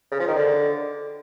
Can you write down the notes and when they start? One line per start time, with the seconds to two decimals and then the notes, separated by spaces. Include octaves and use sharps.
0.12 C#3
0.20 F3
0.28 D#3
0.36 D3